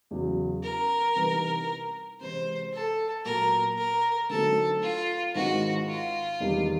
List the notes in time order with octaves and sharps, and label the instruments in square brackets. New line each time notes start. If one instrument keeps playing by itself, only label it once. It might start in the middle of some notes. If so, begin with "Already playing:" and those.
[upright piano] E2 C#3 F#3
[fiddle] A#4
[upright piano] C3 E3 G3 B3 D#4
[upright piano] C3 E3 G#3 C4 [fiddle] C5
[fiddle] A4
[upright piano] A#2 F#3 B3 [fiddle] A#4
[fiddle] A#4
[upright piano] D3 F#3 A3 C4 D#4 [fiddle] A4
[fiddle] F4
[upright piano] G#2 D#3 G#3 C4 E4 [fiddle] F#4
[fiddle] F4
[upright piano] E2 C3 D#3 G3